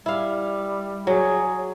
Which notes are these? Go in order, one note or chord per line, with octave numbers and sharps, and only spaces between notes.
G3 E4 F5
F#3 G#4